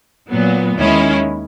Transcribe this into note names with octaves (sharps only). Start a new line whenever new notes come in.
A#2 F#3 B3
D#2 D#3 G#3 C#4 E4